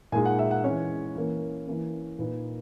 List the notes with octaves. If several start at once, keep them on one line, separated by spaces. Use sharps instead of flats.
A#2 G#3 D#4 G#5
F#5
E5
F#5
E3 G#3 C#4 C#5
E3 A#3 C#4
E3 A#3 C#4
A#2 A#3 D#4 B4